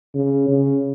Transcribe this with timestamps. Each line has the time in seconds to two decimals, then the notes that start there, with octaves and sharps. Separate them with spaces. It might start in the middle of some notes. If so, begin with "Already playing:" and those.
0.15 C#3
0.49 C#3